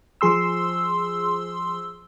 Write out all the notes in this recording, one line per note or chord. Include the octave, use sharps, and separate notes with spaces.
F3 G#4 C6 E6